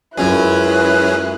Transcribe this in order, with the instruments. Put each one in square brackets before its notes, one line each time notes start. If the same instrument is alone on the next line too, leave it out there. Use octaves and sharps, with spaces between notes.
[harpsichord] C#2 F#2 [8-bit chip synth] F#3 C#4 G#4 [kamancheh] E4 F#6 [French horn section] B4